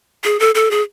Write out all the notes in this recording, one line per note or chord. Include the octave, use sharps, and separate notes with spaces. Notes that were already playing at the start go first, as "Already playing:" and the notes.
G#4
A4
A4
G#4